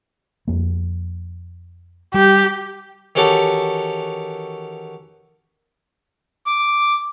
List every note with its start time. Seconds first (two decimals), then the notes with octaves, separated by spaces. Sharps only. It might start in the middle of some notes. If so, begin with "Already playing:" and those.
0.48 F2 A#3
2.14 G3 G4
3.15 D#3 E3 C#4 F#4 G4 A4
6.47 D6